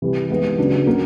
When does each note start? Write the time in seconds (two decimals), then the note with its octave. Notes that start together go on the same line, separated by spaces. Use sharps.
0.02 C3 E3 G3
0.30 E3 G#3 B3 D#4
0.58 C#3 F#3 B3 D4
0.87 C#3 F#3 A#3